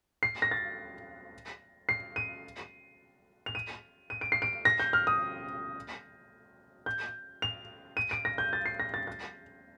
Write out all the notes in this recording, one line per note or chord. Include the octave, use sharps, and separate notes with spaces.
C7
A#6
A6
C7
D#7
F7
D#7
D#7
D7
C7
D7
A#6
G6
F6
D#6
G6
F7
D#7
D7
A#6
G6
A6
C7
A#6
A6
A6